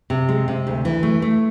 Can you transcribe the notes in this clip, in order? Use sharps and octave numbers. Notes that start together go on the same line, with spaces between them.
C3
G#3
C3
D2
E3
A3
A3